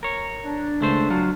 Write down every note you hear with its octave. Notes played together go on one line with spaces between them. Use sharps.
A#4 C#5
D4
C#2 A3 C5
F#3 F4